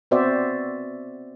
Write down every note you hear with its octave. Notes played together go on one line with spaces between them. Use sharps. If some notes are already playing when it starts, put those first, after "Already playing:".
B3 C4 F#4 C5 D5 E5